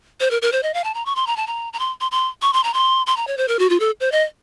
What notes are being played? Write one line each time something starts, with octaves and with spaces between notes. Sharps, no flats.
C5
A#4
A#4
C5
D#5
F5
A5
A#5
C#6
C6
A#5
A5
A#5
A#5
C6
C6
C6
C#6
C6
A#5
C6
C6
A#5
C#5
C5
A#4
F#4
F4
A4
C5
D#5